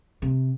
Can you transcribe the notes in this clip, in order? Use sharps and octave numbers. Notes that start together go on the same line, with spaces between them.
C3